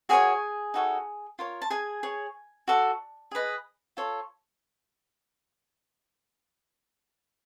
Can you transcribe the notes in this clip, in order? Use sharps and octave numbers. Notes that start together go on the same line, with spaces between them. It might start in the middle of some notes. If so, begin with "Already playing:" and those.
F#4 G#4 A#4 C#5 G#5
D#4 F#4 A4 C#5
F4 A#4 C#5
A5
G#4 G#5
G#4 C#5
F#4 A4 D5
G#4 B4 D#5
F4 A4 C#5